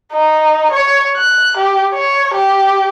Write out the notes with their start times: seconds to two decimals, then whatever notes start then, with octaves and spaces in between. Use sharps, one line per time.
0.13 D#4
0.72 C#5
1.17 F#6
1.57 G4
1.94 C#5
2.34 G4